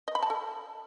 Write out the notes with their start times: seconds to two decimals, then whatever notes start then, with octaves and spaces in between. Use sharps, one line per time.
0.08 D#5
0.15 B5
0.23 A5
0.30 A4